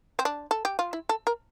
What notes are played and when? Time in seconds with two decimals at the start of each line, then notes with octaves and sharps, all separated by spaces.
0.19 C4
0.25 D4
0.51 A4
0.65 G4
0.79 F4
0.93 E4
1.09 A4
1.27 A#4